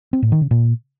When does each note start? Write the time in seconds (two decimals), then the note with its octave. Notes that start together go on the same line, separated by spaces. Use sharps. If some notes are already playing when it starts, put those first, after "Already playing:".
0.13 C4
0.22 A2
0.32 D#3
0.41 C#3
0.51 A#2